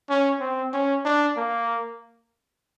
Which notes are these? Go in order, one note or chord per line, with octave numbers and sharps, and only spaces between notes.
C#4
C4
C#4
D4
A#3